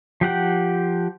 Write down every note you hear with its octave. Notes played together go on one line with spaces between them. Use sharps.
F3 G4 F#5 G5